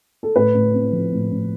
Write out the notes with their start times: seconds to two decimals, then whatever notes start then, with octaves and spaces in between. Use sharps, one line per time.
0.23 A4
0.36 A2 B4
0.54 A2
0.74 C4
0.92 F3
1.12 A2
1.31 A2